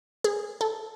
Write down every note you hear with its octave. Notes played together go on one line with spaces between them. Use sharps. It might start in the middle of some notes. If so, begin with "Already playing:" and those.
G#4
A4